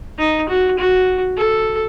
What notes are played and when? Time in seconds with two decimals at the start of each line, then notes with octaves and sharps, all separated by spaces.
0.19 D#4
0.49 F#4
0.78 F#4
1.37 A4